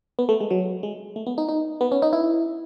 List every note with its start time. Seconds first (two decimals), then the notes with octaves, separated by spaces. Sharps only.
0.19 B3
0.29 A3
0.40 G#3
0.51 F#3
0.83 G#3
1.16 A3
1.27 B3
1.38 D#4
1.49 D#4
1.81 B3
1.92 C#4
2.02 D#4
2.13 E4